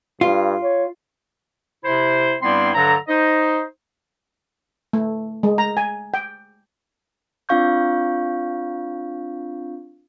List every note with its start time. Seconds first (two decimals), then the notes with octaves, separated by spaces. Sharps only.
0.21 G2 F4
0.62 C#5
1.84 C3 E4 C5
2.42 G2 G3 B3 C4 E4 C6
2.74 G2 D3 F#3 A4 A#5
3.08 D#4 C5 D#5
4.93 A3
5.43 G#3
5.58 A#5
5.77 G#5
6.14 G5
7.49 C4 D4 F4 F5 C#6 G6